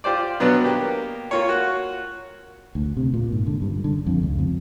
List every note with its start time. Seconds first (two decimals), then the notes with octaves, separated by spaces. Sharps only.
0.04 F4 G4 C5 D5
0.40 B2 F#3 B3 D4
0.64 A#3 G4
1.31 A#3 F4 C#5
1.49 F#4
2.75 D2
2.97 C3
3.14 A#2
3.32 G#2
3.47 D3
3.62 G2
3.84 D3
4.06 F2
4.23 C#2
4.39 F2